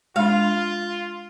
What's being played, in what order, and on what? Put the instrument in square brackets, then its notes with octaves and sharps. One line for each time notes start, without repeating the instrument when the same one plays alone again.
[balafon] G#3 D4 [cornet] F4 [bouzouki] F5